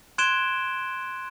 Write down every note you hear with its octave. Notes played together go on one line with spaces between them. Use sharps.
C6 F#6 G#6 D7 E7 G7